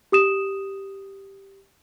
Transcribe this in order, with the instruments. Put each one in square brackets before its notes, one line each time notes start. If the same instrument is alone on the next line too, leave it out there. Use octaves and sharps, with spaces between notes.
[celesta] G4 D#6 E7